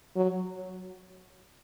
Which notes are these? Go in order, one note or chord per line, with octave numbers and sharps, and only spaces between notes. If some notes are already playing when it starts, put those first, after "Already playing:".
F#3